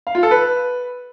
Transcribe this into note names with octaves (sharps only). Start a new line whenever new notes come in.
F5
F4
A4
B4